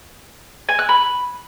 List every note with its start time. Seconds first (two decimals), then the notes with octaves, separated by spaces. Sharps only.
0.69 G#5
0.79 F#6
0.89 B5